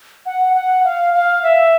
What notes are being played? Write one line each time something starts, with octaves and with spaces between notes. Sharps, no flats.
F#5
F#5
F5
F5
E5